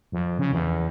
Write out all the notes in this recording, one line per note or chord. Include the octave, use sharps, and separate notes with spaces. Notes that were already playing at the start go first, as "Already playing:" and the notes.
F2
C#3
E2